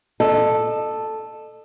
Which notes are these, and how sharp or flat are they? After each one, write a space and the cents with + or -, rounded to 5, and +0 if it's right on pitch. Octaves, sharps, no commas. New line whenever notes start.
A4 +0 D#5 -40